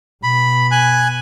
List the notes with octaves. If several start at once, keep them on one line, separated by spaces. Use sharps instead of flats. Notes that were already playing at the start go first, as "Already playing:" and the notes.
B2 B5
G#5 F#6